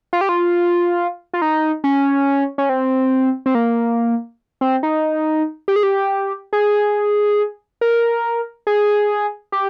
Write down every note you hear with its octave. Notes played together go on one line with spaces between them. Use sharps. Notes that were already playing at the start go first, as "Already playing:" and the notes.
F4
G4
F4
F4
D#4
C#4
C#4
C4
C4
A#3
C4
D#4
G4
G#4
G4
G#4
A#4
G#4
G4